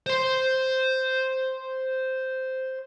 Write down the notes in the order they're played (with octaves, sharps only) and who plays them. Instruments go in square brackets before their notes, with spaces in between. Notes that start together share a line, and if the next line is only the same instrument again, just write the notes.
[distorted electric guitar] C5 C6